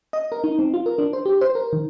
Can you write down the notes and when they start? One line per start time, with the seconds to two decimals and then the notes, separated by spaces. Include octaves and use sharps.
0.13 D#5
0.32 A#4
0.44 D#4
0.59 C4
0.74 F4
0.86 A#4
0.98 D4
1.13 C5
1.25 G4
1.41 C5
1.55 A#4
1.73 D#3